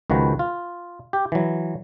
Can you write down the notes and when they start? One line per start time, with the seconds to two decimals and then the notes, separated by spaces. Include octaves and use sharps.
0.10 C#2 D#3 F3 F#4 B4
0.39 F4
1.13 G4
1.32 E3 F#3